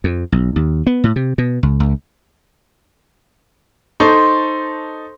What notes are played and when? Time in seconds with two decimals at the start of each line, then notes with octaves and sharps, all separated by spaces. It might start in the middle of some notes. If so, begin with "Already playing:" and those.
0.04 F2
0.32 B1
0.56 D#2
0.87 B3
1.04 A2
1.16 C3
1.38 B2
1.63 C#2
1.80 C#2
4.00 D#4 A4 C5 C#6